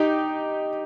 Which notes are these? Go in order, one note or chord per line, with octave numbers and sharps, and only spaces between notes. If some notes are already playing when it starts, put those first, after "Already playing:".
Already playing: D#4 G4